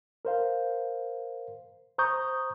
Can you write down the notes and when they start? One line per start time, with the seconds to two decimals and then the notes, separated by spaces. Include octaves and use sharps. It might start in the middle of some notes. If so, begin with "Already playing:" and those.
0.25 A#4 C5 F5
1.98 C5 A#5 C#6 D#6 G6